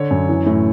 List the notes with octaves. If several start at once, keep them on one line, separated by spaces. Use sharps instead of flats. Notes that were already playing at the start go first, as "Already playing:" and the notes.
Already playing: D3 C#5
F#2
E3
A2